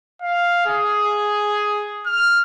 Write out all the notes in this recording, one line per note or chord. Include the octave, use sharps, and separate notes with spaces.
F5
G#4
F6